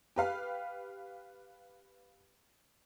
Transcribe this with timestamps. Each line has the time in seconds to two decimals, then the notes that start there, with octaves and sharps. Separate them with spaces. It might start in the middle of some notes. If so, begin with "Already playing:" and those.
0.16 G4 B4 F5